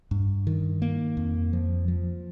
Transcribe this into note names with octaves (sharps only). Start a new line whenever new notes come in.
G2
D#3
A#3
F2
F3
F3